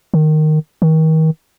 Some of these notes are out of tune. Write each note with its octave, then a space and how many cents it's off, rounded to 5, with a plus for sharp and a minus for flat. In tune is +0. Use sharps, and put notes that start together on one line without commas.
D#3 -10
D#3 +35